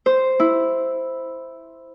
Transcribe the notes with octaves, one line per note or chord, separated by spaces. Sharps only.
C5
E4